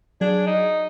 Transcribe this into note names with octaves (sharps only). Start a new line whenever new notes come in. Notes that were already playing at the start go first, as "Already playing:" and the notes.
F#3 D4 G#4
D#4